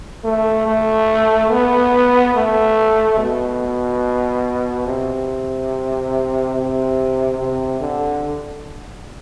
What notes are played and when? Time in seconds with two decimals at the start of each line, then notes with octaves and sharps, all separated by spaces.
0.24 A3
0.67 A3
1.51 B3
2.35 A3
3.19 B2
4.87 C3
6.55 C3
7.39 C3
7.81 D3